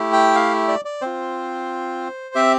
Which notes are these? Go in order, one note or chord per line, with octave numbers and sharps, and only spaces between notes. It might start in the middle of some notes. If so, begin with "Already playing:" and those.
Already playing: A3 E4 G4
G5
F5
D5
D5
C4 F4 C5
C4 G4 E5